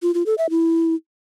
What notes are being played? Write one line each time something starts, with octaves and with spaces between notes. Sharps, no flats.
F4
F4
A4
E5
E4